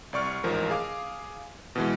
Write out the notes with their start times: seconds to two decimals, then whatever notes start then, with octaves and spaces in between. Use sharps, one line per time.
0.13 C2 D5 C#6 F6
0.44 A1 G#2 F3 A#4
0.70 G#4 F5 D6
1.75 B2 E3 G#3